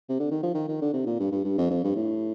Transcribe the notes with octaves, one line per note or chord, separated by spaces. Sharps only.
C3
D3
D#3
F3
D#3
D#3
D3
C3
A#2
G2
G2
G2
F2
F2
G2
A2